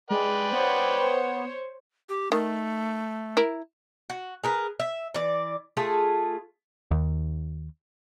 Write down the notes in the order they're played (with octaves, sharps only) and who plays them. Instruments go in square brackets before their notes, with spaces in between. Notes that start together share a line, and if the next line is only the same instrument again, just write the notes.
[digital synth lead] G#3 [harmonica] B4 D5 G5
[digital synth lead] B3 [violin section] C5 C#5
[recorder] G4
[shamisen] D#3 [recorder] A3
[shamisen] E4 A#4
[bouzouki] F#4
G#4 A#4 B4
E5
E3 D5
A3 F4 G#4
[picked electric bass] D#2